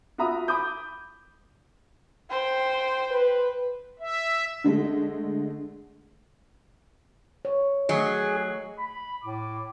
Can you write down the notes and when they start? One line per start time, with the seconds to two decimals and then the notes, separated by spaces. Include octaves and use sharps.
0.18 F4 F#4 E5 A#5 B5 D#6
0.48 B5 D6 D#6 G6
2.31 C5 G5
3.11 B4
3.99 E5
4.64 D3 G#3 A3
7.45 C#5
7.89 F#3 A3 G#4 D#5
8.78 B5
9.23 A2 D6